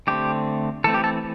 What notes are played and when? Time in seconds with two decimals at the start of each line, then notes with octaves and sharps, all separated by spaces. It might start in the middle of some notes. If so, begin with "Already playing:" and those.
0.07 D3 A3 C4 G4
0.84 E3 A3 C4 A4
0.94 G4
1.04 A4